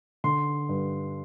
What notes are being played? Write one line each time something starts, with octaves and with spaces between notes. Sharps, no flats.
D3 C6
G2